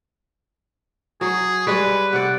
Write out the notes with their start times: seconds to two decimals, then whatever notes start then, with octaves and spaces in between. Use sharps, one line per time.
1.21 F#3 G#4
1.67 G3 G#3 B4 C#5
2.13 C3 D5 F#5